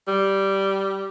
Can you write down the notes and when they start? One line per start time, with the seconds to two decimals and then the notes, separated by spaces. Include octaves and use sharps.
0.08 G3